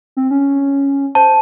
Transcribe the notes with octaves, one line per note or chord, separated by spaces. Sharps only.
C4
C#4
C5 A5